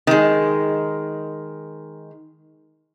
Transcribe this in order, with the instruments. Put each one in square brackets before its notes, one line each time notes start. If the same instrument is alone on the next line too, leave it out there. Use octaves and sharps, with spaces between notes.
[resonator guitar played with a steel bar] D#3 G#3